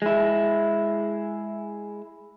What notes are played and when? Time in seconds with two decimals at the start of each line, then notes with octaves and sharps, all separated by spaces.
0.02 G#3 E4